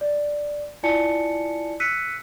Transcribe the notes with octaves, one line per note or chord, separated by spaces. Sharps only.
D5
E4 F4 D5 G#5 A5 C#7
E6 F#6 B6 C#7 D#7